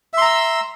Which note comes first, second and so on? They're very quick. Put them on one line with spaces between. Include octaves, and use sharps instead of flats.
E5 C6 A#5 E6